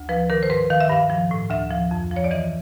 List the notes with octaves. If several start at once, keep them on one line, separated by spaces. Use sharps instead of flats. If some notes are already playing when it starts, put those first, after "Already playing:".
Already playing: D2
F3 B4
D#3 A#4
C5
G#2 B4
D#3 F5
E5
G2 F5
F3
A2
D2 E5
F3
F2
F3
C#5
D5
E3 D#5